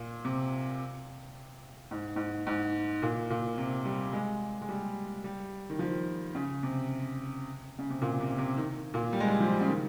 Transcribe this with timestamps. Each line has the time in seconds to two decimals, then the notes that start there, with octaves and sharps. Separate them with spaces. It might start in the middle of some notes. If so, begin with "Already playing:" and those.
Already playing: A#2
0.25 C3
1.91 G#2
2.16 G#2
2.47 G#2
3.02 A#2
3.30 A#2
3.58 C3
3.85 G3
4.13 G#3
4.61 G#3
4.69 G3
5.24 G3
5.70 D#3
5.79 F3
6.35 C#3
6.63 C3
7.79 C#3
7.90 C3
8.02 A#2
8.20 C3
8.38 C3
8.57 D#3
8.94 A#2
9.13 G3
9.20 G#3
9.28 G3
9.40 F3
9.61 C#3
9.68 D#3